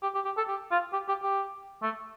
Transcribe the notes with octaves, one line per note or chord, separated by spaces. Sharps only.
G4
G4
G4
A4
G4
F4
G4
G4
G4
A3